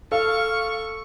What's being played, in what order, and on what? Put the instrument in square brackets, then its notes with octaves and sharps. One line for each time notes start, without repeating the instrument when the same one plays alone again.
[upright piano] A4 [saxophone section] F5 [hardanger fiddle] C#6